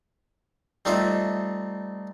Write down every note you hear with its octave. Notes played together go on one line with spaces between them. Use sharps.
G3 A3 C4 D#4 F4 E5